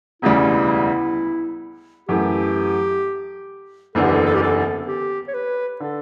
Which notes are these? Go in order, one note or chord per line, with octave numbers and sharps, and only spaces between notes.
E1 D2 C#3 G3 E4
F#2 E3 A3 G4
F#1 E2 D3 A4
G4
A4
A4
G4
A4
A4
G4
C#5
B4
D3 A4